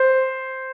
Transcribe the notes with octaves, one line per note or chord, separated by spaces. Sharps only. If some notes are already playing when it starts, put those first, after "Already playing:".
Already playing: C5